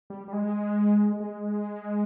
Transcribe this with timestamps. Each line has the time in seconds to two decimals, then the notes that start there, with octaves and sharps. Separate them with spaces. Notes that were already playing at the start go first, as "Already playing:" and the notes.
0.10 G3
0.28 G3
0.33 G#3
1.20 G#3